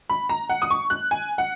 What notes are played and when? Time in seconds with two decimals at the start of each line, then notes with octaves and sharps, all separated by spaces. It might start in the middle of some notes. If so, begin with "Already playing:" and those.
0.09 B5
0.29 A#5
0.49 F#5
0.62 D#6
0.71 C#6
0.90 F#6
1.11 G#5
1.38 F#5